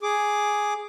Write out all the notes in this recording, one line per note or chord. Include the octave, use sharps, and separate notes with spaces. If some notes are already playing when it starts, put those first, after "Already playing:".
G#4 D6